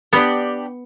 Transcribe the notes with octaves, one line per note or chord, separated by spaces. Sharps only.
B3 D4 G4 D5